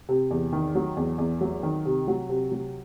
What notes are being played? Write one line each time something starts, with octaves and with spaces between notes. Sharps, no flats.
C3
E2
D#3
F#3
E2
E2
F#3
D#3
C3
F#3
C3
F#3